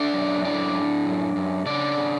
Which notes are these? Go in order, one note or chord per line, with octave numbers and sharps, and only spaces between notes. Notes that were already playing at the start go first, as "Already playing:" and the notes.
Already playing: A3 D4 D5
F#2
A2 D4 D5
A2
F#2
F#2
C#3 D4 D5
C#3